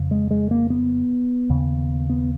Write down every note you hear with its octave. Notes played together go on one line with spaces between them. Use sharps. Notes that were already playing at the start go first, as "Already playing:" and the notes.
Already playing: F2 C#3
G#3
G#3
A#3
B3
D#2 C#3
B3